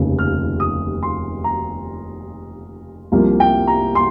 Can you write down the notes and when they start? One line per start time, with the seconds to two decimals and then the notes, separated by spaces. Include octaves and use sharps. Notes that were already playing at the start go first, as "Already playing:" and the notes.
Already playing: F1 D#2 C#3 F3
0.19 F6
0.60 D#6
1.03 C6
1.44 A#5
3.12 C2 C3 F3 A#3
3.40 G5
3.67 A#5
3.95 C6